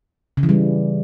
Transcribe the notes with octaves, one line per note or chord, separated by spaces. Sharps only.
C#3
E3
G3